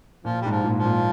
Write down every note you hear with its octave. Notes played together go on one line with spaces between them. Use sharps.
A#2 F3
G#2 G3
F3
A#2
F3
A#2